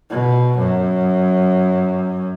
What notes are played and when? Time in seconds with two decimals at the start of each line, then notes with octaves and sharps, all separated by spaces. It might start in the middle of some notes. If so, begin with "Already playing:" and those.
0.10 B2
0.58 F#2